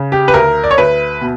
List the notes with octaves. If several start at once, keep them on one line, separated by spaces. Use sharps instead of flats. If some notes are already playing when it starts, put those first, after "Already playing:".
Already playing: C#3
G4
B4
D2 A#4
D5
C#5
D2 B4
B2